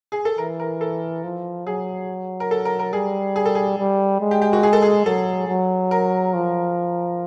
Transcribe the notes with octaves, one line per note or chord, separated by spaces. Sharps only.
G#4
A4
E3 A#4
A#4
A4
F3
F#3 G#4
A#4
A4
A#4
A#4
G3 G#4
G#4
A4
G#4
G3
G#3
G4
G4
F#4
G#4
A4
G#4
F#3 A4
F#3
A#4
F3